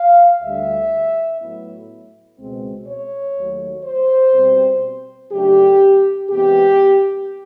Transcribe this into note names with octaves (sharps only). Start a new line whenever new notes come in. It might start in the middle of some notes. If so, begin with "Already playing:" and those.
Already playing: F5
D2 D3 G3 E5
A2 F#3 B3 E4
C#2 B2 G#3 C4
C#5
D#2 D#3 F#3 A3
C5
B2 G3 C4
C#3 F#3 A3 D4 G4
E2 C3 E3 G#3 B3 G4